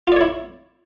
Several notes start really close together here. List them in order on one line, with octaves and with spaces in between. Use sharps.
F4 D5 C#5 E4